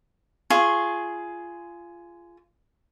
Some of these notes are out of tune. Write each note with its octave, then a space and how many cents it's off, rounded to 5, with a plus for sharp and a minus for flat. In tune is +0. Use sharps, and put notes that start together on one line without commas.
F4 -20 G#4 +10 C#6 -15